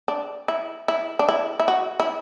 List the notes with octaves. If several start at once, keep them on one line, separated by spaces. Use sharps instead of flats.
D4
E4
E4
D4
E4
E4
F#4
E4